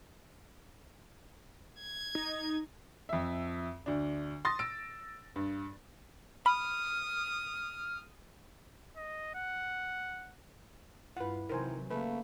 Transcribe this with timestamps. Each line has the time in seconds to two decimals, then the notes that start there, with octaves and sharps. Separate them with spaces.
1.80 G#6
2.15 D#4
3.09 F2 E5
3.86 D2 D4
4.45 C6 D#6 A6 A#6
4.59 E6 D7
5.36 G2
6.46 B5 D#6 F6
8.97 D#5
9.35 F#5
11.17 G2 E4 F4 B4 F#5
11.49 C3 D#3 E3 F#3 A#4 C5 G#5
11.90 C#3 A3 A#3 B4